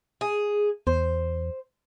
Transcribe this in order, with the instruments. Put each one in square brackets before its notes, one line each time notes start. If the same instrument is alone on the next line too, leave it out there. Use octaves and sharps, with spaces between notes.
[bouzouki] G#4
[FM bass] E2 [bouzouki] C5